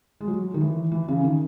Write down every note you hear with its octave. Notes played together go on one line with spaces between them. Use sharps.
G#3
F#3
D#3
E3
E3
C#3
D#3